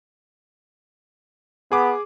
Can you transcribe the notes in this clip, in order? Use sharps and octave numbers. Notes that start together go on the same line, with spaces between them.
B3 G#4 D6